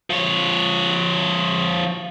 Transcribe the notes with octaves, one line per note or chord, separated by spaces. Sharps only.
F3 C#5